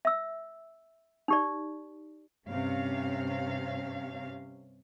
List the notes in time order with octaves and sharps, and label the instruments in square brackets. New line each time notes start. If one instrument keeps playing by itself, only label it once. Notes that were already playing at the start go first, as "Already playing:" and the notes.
[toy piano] E5 E6
D#4 G4 D5
[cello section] G2 C3 C#4 F5